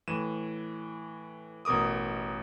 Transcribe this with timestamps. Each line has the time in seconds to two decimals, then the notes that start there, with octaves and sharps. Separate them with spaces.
0.08 A2 E3 D#7 E7
1.65 A1 B2 A#4 D6 D#6